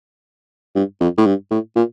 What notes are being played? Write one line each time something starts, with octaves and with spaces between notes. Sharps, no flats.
G2
F2
A2
G2
A2
A#2